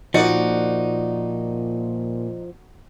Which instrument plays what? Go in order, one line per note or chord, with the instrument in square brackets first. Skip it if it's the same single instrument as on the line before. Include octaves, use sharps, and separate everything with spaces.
[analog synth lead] A#2 [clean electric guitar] F3 [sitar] D#4 D5 [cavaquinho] F#4